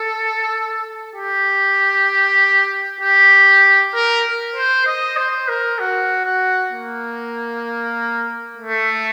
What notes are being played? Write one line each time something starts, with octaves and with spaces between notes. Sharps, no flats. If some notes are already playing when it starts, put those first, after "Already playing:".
Already playing: A4
G4
G4
A#4
C5
D#5
C5
A#4
F#4
F#4
A#3
A3